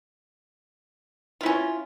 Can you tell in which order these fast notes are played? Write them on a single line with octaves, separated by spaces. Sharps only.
F4 E4 C#4